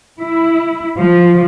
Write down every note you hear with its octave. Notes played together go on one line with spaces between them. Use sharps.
E4
F3